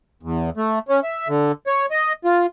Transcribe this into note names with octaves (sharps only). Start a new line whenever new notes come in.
E2
A3
C#4
E5
D3
C#5
D#5
F4